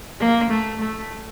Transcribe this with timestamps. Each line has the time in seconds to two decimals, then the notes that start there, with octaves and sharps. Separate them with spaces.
0.20 A#3
0.50 A3
0.81 A3